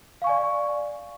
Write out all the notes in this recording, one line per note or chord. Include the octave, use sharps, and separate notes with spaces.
D5 F5 G#5 C#6